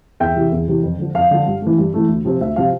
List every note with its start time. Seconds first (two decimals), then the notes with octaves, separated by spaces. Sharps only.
0.20 E2 E5 G5
0.36 C3 E3
0.52 E2
0.68 C3 E3
0.83 F2
0.99 D3 F3
1.15 F2 F5
1.31 D3 F3
1.47 G2
1.62 E3 A3
1.78 G2
1.94 E3 A3
2.09 D2
2.25 C3 F3 C4
2.41 D2 E5
2.56 C3 F3 C4 F5